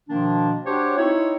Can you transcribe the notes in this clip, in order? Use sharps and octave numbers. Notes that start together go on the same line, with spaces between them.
B2 D#3 F3 A#3 D4
D4 F#4 G4 C5 C#5
C4 D#4 E4 C#5